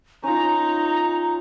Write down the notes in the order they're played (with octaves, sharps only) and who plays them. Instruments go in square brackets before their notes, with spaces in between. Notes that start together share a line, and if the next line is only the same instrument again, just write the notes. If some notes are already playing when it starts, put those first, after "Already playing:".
[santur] C#4 F4 [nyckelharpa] D#4 [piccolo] A#5